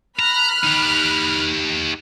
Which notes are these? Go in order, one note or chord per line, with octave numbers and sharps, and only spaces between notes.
A#5 B5 F6 F#6
D#4 G4